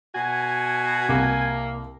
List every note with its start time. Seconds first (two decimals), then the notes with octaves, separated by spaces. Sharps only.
0.14 B2 F#4 G#5
1.09 C2 A#3